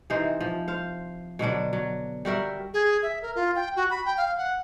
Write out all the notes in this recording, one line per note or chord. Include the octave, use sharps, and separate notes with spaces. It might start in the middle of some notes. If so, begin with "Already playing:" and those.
C3 E3 D#4 C5
F3
C5 F5
B2 D3 F#3 D4
F#3
G3 F#4 A#4 E5
G#4
E5
A#4
F4
G5
F#4
B5
G5
F5
F#5